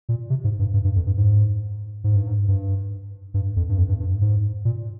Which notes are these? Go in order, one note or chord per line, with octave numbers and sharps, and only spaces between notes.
A#2
C3
G#2
G2
G2
G2
F2
G2
G#2
G#2
G2
G#2
G2
G2
F2
G2
F2
G2
G2
G#2
A#2